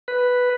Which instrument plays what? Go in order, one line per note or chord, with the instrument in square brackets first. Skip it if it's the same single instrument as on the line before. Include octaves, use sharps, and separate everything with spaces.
[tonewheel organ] B4